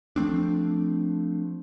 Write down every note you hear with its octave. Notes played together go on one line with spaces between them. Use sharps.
F3 A3 C4 D4